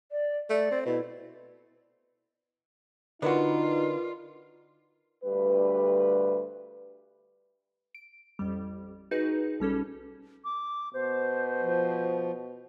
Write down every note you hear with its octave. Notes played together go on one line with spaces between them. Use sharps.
D5
A3 D5
C4
B2 E4
D3 D#4 F4 F#4 A#4 B4 D5
D2 G2 G3 B4
D7
A1 F2 G3
D#4 F#4 G#4 B4
B1 G3 C#4 A4
D6
B2 C5
F3